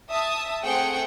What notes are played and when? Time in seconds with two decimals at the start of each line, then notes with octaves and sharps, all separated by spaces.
0.11 E5 A5 D#6
0.64 A3 C4 G#4 F#5 G5 C#7